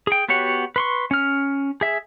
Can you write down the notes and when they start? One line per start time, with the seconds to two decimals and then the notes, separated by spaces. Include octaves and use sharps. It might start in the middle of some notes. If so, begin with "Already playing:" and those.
0.07 G#4 G5
0.29 B3 F#4 G4 C#5 F#5
0.76 B4 C6 C#6
1.11 C#4 F6
1.81 G#4 E5